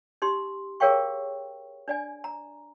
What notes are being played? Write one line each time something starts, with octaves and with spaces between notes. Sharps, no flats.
D#4 G4 C6
G#4 A#4 C#5 F5 G5 C#6
D4 D5 G#5
A#5